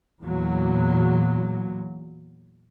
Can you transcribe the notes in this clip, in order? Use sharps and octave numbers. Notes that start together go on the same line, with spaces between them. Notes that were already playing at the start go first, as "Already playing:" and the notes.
E2 A#2 F#3